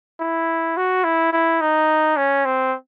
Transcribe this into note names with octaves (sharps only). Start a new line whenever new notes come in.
E4
F#4
E4
E4
D#4
C#4
C4